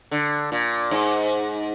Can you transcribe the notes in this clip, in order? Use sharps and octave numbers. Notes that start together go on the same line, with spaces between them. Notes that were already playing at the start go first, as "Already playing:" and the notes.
D3
A#2
G#2